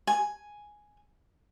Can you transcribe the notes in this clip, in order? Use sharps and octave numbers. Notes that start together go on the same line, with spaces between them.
G#5